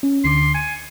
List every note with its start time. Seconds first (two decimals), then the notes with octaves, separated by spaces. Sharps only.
0.03 C#4
0.24 D2 D3 C6 D6
0.55 G#5 C#7